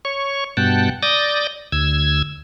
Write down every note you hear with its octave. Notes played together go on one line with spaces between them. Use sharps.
C#5 C#6
G2 B2 F#5 G5 A5
D5 D#6 G6 A6 A#6
D2 E6 G#6